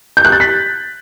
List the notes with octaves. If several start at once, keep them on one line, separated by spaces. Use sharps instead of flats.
G6
F#6
A6
B6